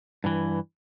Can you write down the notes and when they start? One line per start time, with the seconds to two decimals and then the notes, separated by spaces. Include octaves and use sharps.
0.24 G2 E3